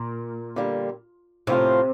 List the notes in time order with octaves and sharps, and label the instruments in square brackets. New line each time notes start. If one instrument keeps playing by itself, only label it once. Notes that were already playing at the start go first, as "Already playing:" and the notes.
Already playing: [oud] A#2
[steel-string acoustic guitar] D3 G3 A#3
[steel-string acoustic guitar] A2 F3 C4 F4 [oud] C3